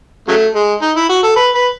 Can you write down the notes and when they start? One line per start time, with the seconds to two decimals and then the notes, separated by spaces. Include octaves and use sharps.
0.28 C#3 F#3 A3
0.55 G#3
0.82 D#4
0.96 E4
1.09 F#4
1.23 A4
1.36 B4
1.55 B4